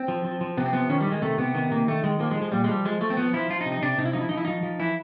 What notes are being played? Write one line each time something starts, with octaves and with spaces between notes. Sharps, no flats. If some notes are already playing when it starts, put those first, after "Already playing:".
Already playing: C4
F3
F3
F3
C3 B3
C4
F3 B3
D#3 C#4
G3
D#3
G#3
C3 A3
C3 B3
D#3 B3
C3 A#3
D#3 A3
D#3 G#3
F3 A#3
G#3
F3
G#3
A#2 G3
G#3
F3 G3
F3 G#3
F3 A3
C4
F3 B3
F3 E4
F3 F4
D#4
C3
D#4
C3 D4
C3 D#4
E4
F3 D#4
E4
F3 D#4
E4
F3 D#4
F3
E3 E4